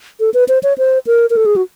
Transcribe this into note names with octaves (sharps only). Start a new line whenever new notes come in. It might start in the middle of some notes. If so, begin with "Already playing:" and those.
A4
B4
C5
C#5
C5
A#4
A#4
A4
G#4
F#4